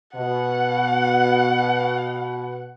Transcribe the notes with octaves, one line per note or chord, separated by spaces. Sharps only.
B2 F#5